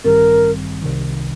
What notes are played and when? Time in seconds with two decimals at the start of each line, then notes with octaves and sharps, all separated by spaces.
0.04 A1 G2 D#3 G3 C4 A#4
0.82 C2 C3 D#3